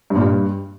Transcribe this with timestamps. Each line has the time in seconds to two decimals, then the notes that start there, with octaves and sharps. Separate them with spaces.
0.10 G2
0.16 A#2
0.21 G2